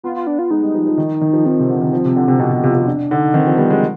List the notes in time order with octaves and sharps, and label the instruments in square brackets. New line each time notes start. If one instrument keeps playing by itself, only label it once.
[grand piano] B3 [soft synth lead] F4
[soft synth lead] F4
D4
F4
[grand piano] G#3 [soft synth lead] D#4
[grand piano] G3
F3
F3
D#3
D#3
F3
[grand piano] F3 [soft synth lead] C4
[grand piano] C3
D3
D#3
F3
C3
D3
C3
[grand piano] B2 [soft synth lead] G4
[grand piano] B2
[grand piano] C3 [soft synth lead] F4
[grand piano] C3
[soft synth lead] D4
[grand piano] D3 [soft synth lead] D#4
[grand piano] D#3 [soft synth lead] C4
[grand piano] F3 [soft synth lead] C4
[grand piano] G3 [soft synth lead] B3
[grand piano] G#3 [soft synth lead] C4